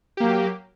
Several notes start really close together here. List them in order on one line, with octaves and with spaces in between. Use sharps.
G4 A#3 F#3